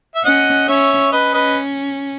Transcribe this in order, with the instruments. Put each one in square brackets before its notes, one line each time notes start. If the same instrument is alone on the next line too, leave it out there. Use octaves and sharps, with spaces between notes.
[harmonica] E5
[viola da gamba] C#4 [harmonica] D#5 F#5
[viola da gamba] C#4 [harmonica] C#5 E5
[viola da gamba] C#4 [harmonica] B4 D#5
[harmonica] B4 D#5